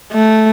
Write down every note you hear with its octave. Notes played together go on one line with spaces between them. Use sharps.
A3